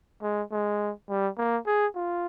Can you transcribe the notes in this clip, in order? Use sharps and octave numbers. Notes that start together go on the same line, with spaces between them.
G#3
G#3
G3
A#3
G#4
F4